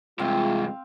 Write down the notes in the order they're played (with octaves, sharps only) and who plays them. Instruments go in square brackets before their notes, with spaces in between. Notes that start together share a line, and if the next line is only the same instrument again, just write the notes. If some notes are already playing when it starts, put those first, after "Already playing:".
[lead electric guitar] G2 C3 [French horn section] G#3 F4 [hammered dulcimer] C4 F5